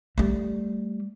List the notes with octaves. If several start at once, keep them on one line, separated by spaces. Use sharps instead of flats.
G3 A3